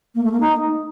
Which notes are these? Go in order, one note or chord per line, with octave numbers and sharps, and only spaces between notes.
A#3
A3
A#3
D#4